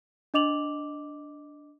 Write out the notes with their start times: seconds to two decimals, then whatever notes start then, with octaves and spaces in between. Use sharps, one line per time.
0.34 D4 D#5 D6 F7 F#7